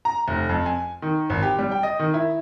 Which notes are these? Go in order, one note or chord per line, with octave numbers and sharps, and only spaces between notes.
A#5
F1
F2
G#5
D#3
G#1
G4
G3
G5
D#5
D#3
E4